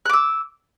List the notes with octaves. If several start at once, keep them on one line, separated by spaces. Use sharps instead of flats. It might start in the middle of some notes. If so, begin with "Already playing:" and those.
D6 E6 F#6